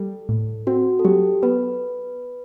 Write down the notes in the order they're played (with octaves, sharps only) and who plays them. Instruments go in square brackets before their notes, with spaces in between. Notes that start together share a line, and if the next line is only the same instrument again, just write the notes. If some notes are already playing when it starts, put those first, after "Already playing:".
Already playing: [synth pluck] G3 [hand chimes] A4
[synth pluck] A2
[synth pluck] C4 [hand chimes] F#4
[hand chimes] A4
[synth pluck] F#3 [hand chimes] G4
[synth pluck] B3 [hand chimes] B4